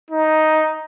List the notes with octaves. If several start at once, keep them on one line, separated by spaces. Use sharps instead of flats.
D#4